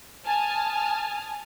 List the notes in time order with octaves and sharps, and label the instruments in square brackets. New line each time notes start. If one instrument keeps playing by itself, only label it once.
[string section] G#5 A5 D#6 F6